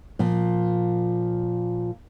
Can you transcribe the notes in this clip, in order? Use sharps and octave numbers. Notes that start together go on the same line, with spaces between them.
A#2 F3